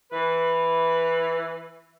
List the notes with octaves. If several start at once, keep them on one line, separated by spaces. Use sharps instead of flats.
E3 B4